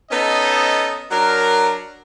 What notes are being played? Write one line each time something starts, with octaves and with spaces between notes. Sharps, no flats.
B3 C#4 D#4 A4 D#5
F#3 D4 A#4